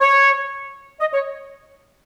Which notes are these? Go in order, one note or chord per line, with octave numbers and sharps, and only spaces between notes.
C#5
D#5
C#5